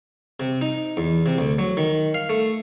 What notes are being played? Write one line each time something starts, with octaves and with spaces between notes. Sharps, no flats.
C3
D#4
E2
C3
D2
F#3
D#3
F5
A3